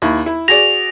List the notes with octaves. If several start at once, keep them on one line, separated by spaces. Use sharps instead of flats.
D#2 E4
E4
F#4 G#4 D5 A#6 F7